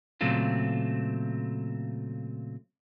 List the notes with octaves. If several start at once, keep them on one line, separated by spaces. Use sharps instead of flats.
A#2 C#3 F#3 A3 C4 F4